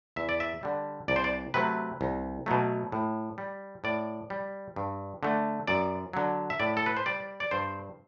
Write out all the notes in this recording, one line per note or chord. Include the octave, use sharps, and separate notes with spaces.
E2 E5
D5
E5
D3 G3
C2 D5
C5
D5
C3 F#3 A3 B4
C2
B2 F#3 A3
A2
G3
A2 D5
G3
G2
D3 A3
F#2 D5
D3 F#3
E5
A2 D5
A4
B4
C5
G3 D5
D5
G2 C5